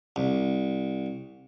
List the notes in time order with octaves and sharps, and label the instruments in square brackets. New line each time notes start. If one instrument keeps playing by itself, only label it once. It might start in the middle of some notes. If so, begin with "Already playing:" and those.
[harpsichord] C2